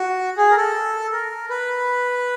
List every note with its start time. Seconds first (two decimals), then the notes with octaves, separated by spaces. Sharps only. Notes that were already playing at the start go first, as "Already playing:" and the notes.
Already playing: F#4
0.37 G#4
0.51 A#4
0.57 A4
1.12 A#4
1.50 B4